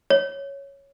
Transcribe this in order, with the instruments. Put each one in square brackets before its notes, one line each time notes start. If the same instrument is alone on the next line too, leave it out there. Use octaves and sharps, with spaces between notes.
[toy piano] C#5